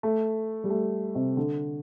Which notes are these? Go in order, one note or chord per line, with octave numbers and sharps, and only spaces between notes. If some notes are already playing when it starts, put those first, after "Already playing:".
A3
G3
A3
C3
D3